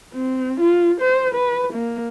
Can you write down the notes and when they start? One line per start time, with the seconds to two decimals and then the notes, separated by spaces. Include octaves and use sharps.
0.14 C4
0.61 F4
1.01 C5
1.35 B4
1.73 A#3